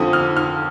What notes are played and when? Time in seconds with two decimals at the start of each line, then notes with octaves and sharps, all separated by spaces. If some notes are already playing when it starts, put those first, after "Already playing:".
Already playing: F2 D3 F3 D#6
0.13 F6
0.37 F6